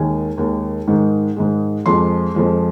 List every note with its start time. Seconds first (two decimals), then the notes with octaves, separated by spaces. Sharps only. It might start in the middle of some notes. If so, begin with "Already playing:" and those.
Already playing: D#2 D#3 G#3 G#5
0.38 D#2 D#3 G#3
0.88 G#2 D#3 G#3
1.36 G#2 D#3 G#3
1.86 F2 F3 G#3 C6
2.34 F2 F3 G#3